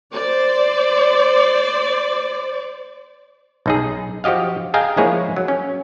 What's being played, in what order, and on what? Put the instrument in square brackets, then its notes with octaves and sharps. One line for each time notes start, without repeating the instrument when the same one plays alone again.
[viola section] C5 D5
[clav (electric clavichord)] B1 D#4 G#4
F3 F#4 G4 D#5 F5
G#4 D#5 F5 G5 G#5 A#5
F3 G#3 A#3 E4 G#4 C#5
F#3
C#4